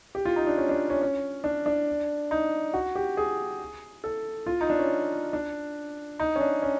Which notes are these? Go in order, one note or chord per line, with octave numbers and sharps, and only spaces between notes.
G4
F4
D#4
D4
C#4
D4
C#4
C#4
D4
D4
D#4
F#4
G4
G#4
A4
F4
D#4
D4
C#4
D4
D#4
C#4
D4
C#4